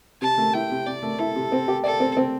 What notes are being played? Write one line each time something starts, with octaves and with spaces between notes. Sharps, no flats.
C3 A5
A3
E4 G5
C3
C3 D5
A3
E4 A4
C3
C4
G4
A4 D5
C4
C4